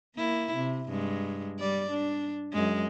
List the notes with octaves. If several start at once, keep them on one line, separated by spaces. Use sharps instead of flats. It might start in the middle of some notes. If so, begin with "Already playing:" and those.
A#3 E4
C3
G2 G#3
G3 D5
D4
F#2 G#3